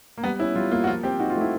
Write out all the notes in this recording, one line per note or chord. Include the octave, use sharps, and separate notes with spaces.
A#3
G3 B3
C#4 E4
G3 F4
A#3 F4
F#4
F3 F4
C4 G4
D#4 F#4
F4
A3 E4